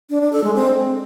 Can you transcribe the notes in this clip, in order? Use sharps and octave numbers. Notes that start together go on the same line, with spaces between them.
D4
D4
A4
G#3
C4